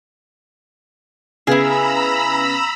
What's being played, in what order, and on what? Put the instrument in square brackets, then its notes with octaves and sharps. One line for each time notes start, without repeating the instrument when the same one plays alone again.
[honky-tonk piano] C#3 B3 [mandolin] E4 G#4 [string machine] A#5 B5 E6